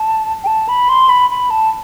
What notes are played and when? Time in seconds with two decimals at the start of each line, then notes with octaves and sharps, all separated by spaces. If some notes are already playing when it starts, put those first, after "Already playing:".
Already playing: A5
0.44 G5
0.47 A5
0.69 B5
0.89 C6
1.09 B5
1.30 B5
1.50 A5